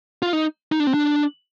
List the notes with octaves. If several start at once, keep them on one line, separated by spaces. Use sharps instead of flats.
F4
D#4
D#4
D4
C4
D4